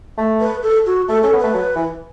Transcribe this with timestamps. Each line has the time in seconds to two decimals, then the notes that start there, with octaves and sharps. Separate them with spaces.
0.18 A3
0.40 B4
0.63 A4
0.86 F#4
1.08 A3 A4
1.23 C#4 A4
1.33 B3
1.39 A3 B4
1.54 F#3
1.75 E3